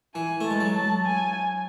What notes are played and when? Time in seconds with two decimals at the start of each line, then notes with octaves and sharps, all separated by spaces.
0.15 E3 G#5
0.41 A3 A5
0.51 G#3
0.61 F#3
0.75 A5
1.05 G#5